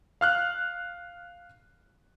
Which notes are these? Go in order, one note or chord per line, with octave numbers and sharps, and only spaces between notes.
F5 F6 F#6